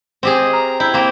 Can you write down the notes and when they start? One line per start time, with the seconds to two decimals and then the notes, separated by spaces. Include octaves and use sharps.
0.23 C4 G4 G#4
0.40 D#5
0.53 A#5
0.80 E4 G5
0.94 A#3 C4